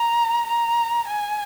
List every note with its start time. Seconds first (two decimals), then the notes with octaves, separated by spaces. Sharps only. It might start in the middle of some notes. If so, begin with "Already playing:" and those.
Already playing: A#5
0.47 A#5
1.08 G#5